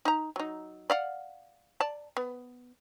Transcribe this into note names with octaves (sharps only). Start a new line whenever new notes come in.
D#4 A#5
F#3 D#4
D5 F5 F#5
D5 A5
B3